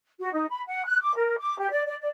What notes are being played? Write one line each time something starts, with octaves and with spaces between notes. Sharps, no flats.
F#4
D#4
B5
F#5
F#6
D6
A#4
D6
G4
D5
D5
D5